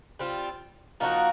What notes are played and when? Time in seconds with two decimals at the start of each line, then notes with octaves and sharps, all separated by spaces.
0.19 G3 C4 F4
1.00 F3 A#3 D#4 F#4